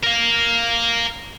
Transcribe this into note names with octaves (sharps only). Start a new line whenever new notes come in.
A#4 F5